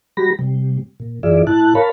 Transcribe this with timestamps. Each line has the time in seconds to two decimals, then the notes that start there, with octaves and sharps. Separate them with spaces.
0.17 G3 F#4 G4 B5 A#6
0.39 C3 G3
1.00 A#2
1.23 F#2 E3 F4 G#4 D5 E5
1.47 A2 E4 A5 F#6
1.75 A#4 C#5 F5 A5 B5